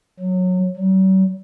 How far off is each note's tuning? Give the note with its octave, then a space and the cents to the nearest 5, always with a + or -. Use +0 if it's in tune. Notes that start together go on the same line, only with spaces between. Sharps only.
F#3 -20
F#3 +45